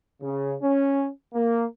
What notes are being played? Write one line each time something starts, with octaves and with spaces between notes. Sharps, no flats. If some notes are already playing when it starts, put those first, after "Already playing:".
C#3
C#4
A#3